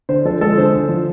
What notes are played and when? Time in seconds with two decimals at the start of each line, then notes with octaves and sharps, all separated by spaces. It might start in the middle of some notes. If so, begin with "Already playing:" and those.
0.09 D3 C5
0.25 F3 A4
0.41 G#3 A4
0.57 D3 C5
0.73 D3
0.89 F3